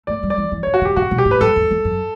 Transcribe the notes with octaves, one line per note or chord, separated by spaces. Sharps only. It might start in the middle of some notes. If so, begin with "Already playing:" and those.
A3 D5
G3
D5
E3
E3
D3 C#5
F#4
C#3 G4
C#3 F#4
B2
G4
A2
B4
F#2 A4
E2
E2
F#2